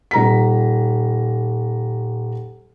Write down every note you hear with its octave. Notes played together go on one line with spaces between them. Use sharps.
D#1 A#5 B6